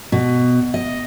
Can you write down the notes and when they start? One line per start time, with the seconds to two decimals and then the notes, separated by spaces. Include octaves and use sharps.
0.12 B2
0.74 D#5